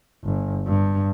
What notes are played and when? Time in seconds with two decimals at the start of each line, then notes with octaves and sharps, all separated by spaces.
0.24 G1
0.67 G2